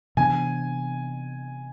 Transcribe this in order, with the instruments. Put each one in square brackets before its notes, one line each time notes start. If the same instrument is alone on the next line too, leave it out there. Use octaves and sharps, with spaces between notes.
[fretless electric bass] C3 E3 B3 D4 [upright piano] G#5